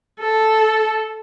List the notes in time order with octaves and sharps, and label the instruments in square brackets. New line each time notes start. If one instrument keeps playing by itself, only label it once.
[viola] A4